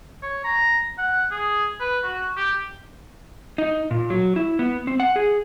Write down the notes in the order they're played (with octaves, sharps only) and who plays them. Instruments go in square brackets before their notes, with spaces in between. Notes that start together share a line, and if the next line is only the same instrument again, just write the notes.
[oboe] C#5
A#5
F#5
G#4
B4
F#4
G4
[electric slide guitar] D#4
A#2
F#3
E4
B3
C4
F#5
G#4